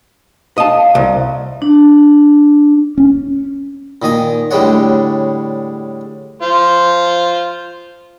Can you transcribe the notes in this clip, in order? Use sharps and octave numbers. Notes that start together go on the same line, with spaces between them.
D#5 F5 A5
C2
D4
C#4
A#2 D#3 D#5 G#5
A2 D3 G3 G#3 C#5 F#5
F4 C5